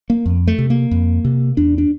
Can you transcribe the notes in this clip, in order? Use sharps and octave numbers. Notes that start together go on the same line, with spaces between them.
A#3
F2
A3
C3
A#3
F2
C3
E2 D4
D4